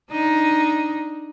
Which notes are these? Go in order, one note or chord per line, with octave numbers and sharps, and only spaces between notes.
D4 D#4